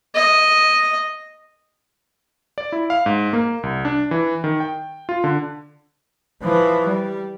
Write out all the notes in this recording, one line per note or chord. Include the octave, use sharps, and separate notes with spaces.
D#5
D5
E4
F5
G#2
A#3
C2
D4
E3
D#3
G5
F4
D3
E3 F3
G3